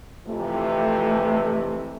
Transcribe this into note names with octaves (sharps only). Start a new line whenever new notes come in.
F2 C3 E3 A3